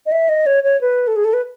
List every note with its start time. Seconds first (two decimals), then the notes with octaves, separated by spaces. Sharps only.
0.06 D#5
0.12 E5
0.29 D#5
0.46 C#5
0.64 C#5
0.81 B4
1.07 A4
1.16 G#4
1.24 A4
1.33 B4